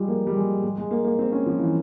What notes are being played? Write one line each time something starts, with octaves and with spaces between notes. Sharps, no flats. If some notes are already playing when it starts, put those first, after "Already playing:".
Already playing: F3 G3 G#3
A#3
G3
G#3
G#3
G#3
A#3
A#3
C4
C#4
F3
E3